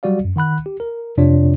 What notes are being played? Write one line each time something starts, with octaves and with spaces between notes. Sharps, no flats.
F#3 G3 F#4 D5 F5
F#2
D#3 F#5 B5 F#6
G4
A#4
F2 C3 D4 F4 C#5 D5